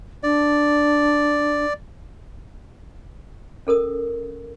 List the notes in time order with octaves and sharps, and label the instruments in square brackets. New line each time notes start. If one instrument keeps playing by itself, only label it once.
[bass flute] D4 [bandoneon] D5
[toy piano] C#4 A4 A#4 D#6